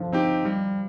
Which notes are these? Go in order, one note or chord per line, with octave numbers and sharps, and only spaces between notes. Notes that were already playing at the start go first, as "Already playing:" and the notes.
Already playing: D3 F3
C4 D#4 G4
G3